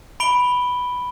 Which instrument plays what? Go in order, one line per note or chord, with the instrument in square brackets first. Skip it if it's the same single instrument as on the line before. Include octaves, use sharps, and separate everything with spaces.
[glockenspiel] B5 D7 G7